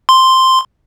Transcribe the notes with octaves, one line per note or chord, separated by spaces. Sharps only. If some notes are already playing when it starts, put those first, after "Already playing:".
C6